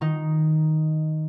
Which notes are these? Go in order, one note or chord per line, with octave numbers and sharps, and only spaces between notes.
D#3 D#4